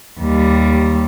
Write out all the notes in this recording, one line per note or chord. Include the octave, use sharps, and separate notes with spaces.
D#2 G3